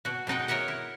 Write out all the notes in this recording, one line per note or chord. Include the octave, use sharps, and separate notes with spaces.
B2 F#4
B2 G#3 D#4 F#5 G5
A#4 C#5 D#5 E5 F#5
E4